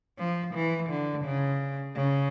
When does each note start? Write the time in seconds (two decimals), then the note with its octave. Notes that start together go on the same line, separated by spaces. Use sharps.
0.19 F3
0.55 E3
0.90 D3
1.25 C#3
1.96 C#3